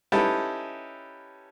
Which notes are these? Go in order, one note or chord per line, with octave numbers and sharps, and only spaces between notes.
C#4 D#4 E4 G4 A4 B4